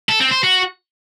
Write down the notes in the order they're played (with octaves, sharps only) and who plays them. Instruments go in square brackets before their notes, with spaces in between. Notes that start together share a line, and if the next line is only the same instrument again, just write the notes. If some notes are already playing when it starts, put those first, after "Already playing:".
[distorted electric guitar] A4
C4
C5
F#4